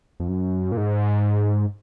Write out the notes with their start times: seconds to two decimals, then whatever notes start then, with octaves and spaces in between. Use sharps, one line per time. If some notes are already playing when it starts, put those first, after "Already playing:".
0.20 F2
0.28 F#2
0.72 A#2
0.77 G#2